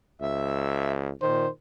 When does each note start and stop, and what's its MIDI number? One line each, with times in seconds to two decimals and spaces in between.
0.21 1.12 37
0.21 0.91 76
1.22 1.45 46
1.22 1.48 51
1.22 1.49 72